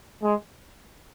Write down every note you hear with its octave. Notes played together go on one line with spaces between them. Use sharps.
G#3